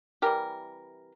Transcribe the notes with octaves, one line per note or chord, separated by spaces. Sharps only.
C3 E3 G3 G4 A#4